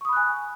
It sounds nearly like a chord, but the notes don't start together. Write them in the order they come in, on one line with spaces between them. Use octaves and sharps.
C#6 D#6 B5 F#6 G#5